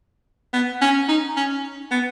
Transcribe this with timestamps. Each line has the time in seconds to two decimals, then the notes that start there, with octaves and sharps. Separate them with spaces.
0.53 B3
0.82 C#4
1.09 D#4
1.37 C#4
1.91 B3